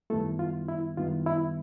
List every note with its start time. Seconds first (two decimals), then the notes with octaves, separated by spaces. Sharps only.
0.10 F#2 D#3 G3 A3 B3 E4 A4
0.39 F4
0.69 E4
0.97 F#2 D#3 G3 B3 E4 F4
1.26 E4